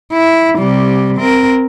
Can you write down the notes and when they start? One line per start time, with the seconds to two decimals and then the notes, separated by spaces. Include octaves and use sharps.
0.13 E4
0.58 C3 G3
1.17 C4 A#4